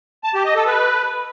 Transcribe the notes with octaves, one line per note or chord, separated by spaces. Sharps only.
A5
G4
D#5
A4
B4